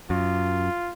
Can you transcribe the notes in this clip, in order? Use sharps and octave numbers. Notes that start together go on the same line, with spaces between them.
F#2 F4